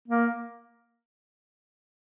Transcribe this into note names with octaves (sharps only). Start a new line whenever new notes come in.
A#3